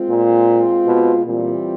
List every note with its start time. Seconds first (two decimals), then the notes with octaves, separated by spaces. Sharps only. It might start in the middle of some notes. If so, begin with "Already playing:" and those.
Already playing: G#3 C4 F4
0.08 A#2
0.86 B2
1.25 A#2 E3 G3 C4 F4